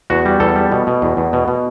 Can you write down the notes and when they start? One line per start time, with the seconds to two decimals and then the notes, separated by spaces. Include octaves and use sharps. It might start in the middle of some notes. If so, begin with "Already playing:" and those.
0.10 E2 F#4
0.26 G3
0.40 E2 A4
0.56 G3
0.72 B2
0.87 B2
1.02 E2
1.17 E2
1.33 B2
1.48 B2